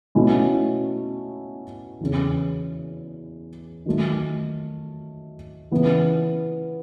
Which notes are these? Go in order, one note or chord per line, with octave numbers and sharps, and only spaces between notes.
B2 A3 C#4 E4
E2 C#3 E3
D#3 F#3 A3 D#4
C#3 E3 B3